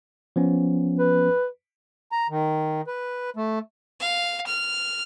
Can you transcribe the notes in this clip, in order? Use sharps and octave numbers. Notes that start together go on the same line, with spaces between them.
F3 B3 C#4
B4
A#5
D#3
B4
A3
F5
F6